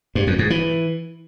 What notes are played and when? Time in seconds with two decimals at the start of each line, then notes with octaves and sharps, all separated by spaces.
0.15 G2
0.27 F2
0.39 G#2
0.50 E3